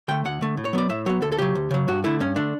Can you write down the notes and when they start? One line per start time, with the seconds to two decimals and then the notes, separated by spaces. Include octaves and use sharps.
0.08 D3 A3 G5
0.25 D2 F#5
0.41 D3 A3
0.57 A2
0.65 C#5
0.73 F#3 B3 D5
0.89 A2 E5
1.06 F#3 B3 C#5
1.22 D2 A4
1.32 A4
1.38 C#3 F#3 G4
1.55 D2
1.71 C#3 F#3
1.88 G2 F#4
2.04 D3 A3 E4
2.20 G2 C#4
2.36 D3 A3 D4